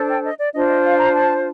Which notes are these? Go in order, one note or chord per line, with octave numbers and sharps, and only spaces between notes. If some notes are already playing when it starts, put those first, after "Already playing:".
Already playing: D4 A4 C5
G5
D#5
D5
D4 F4 C5 D#5
D#5
F5
A#5
A5